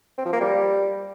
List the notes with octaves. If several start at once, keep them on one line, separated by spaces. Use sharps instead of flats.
C4
F3
A#3
G3